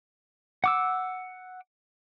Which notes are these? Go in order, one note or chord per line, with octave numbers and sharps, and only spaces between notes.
F#5 D6 E6